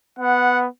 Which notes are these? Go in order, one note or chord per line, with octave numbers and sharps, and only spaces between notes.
B3 F#5